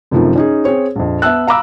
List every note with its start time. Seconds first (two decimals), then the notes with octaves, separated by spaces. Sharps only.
0.11 F#2 C3 D#3 F3 A3 D#4
0.36 C#4 D#4 G#4
0.65 C4 G#4 C#5
0.96 A#1 F2
1.22 B3 E5 A5 E6 F#6
1.47 F5 A#5 B5 D6 E6